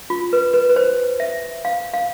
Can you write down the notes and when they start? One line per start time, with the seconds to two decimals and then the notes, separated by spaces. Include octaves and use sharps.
0.10 F4
0.33 B4
0.54 B4
0.69 B4
0.76 C5
1.20 E5
1.65 F5
1.94 F5